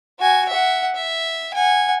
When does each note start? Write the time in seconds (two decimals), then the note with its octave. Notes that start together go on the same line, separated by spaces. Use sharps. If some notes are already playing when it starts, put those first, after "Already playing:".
0.20 F#4 G#5
0.49 E5 F#5
0.95 E5
1.54 F#5 G#5